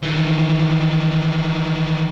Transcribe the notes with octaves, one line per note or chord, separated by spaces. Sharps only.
D#3 E3